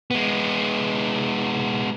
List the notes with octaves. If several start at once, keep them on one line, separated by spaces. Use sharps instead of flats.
G#3 B3